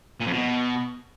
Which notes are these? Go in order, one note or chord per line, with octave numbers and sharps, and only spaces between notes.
A#2
F2
B2